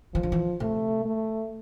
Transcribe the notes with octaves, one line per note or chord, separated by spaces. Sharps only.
E3 F3
D3
E3
C3 A3
A3